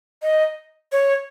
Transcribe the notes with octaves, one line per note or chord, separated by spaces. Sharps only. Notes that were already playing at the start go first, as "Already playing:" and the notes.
D#5
C#5